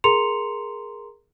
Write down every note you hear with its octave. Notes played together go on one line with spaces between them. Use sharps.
G#4 A#4 A#5 C6 C#7 F7